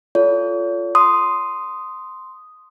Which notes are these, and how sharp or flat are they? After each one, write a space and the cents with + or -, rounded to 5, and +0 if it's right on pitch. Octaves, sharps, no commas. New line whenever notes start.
F4 -5 A4 +0 C#5 +45
C6 -5 D#6 +0